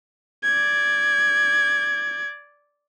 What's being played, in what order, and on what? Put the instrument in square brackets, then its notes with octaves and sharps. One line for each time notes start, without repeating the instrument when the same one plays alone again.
[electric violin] D5 G#6